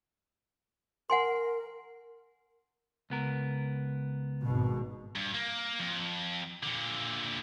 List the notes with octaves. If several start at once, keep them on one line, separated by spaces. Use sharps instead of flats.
A#4 F#5 G#5 C6
C#2 B3 A#4
G#1 B2
G2
A#3
F2
A#2 D3